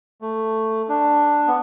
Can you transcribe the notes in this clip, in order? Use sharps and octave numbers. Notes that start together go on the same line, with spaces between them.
A3
D4
B3